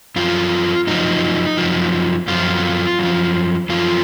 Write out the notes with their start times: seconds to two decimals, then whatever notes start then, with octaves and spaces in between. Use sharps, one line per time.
0.16 F#2 F3 F4
0.87 F#2 F3 D#4
1.58 F#2 F3
2.28 F#2 F3 F4
2.99 F#2 F3
3.69 F#2 F3 F4